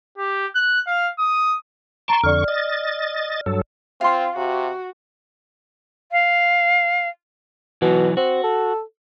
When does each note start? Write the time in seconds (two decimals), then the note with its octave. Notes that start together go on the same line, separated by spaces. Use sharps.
0.18 G4
0.55 F#6
0.87 F5
1.19 D#6
2.08 A5 A#5 C6 C#6 D7
2.24 F2 D3 D5 C#6 F6
2.48 D#5 A6
3.46 G2 F#3 A4
4.01 C4 F4 F5 C6
4.37 C3 F#4
6.12 F5
7.82 B2 E3 F#3
8.17 C4 F#4
8.44 A4